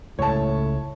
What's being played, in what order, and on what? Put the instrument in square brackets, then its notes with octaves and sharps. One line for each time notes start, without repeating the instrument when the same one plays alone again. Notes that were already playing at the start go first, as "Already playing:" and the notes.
[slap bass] C#2 [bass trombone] A2 [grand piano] C#5 A5